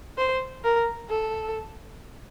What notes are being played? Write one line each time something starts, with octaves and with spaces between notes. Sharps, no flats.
C5
A#4
A4